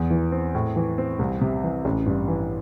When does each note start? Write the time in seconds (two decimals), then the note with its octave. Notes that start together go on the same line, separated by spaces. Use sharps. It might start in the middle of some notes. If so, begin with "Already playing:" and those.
Already playing: E2
0.11 E3
0.32 C4
0.55 A2
0.76 E3
0.98 C4
1.19 C2
1.41 C3
1.64 E3
1.85 A1
2.06 G2
2.28 E3